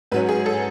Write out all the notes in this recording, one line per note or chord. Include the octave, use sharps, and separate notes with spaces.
G#2 F#3 C#4 B4
G#4
A4